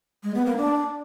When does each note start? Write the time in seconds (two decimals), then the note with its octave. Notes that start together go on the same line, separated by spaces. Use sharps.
0.23 G#3
0.34 B3
0.46 A#3
0.57 D4